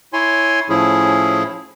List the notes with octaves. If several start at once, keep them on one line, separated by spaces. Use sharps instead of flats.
E4 C#5 G#5 C6
A2 F3 C#4 E4 G#4